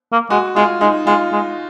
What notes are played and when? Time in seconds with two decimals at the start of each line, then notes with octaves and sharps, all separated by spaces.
0.12 A#3
0.30 G#3 F#4
0.56 G#3 F4
0.81 G#3 D#4
1.07 G#3 F4
1.32 G#3